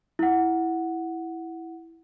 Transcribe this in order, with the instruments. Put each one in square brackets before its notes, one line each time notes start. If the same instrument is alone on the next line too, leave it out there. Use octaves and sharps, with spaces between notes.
[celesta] E4 F#5